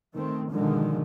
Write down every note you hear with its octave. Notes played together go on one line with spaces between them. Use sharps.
D#3 A3 C4
B2 D3 D#3 F3 G#3